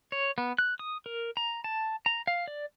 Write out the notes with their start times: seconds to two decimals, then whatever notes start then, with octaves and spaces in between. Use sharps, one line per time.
0.12 C#5
0.38 B3
0.58 F#6
0.79 D#6
1.06 A#4
1.37 A#5
1.64 A5
2.06 A#5
2.27 F5
2.48 D5